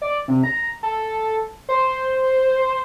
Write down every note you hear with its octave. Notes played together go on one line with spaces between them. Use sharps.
D5
C3
A#5
A4
C5